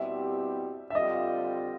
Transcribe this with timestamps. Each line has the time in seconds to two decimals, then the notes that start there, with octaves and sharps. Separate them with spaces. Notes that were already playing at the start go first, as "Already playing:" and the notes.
Already playing: B2 G3 C4 E4 G4 E5
0.90 E5
0.95 D3 G3 C4 F4 D#5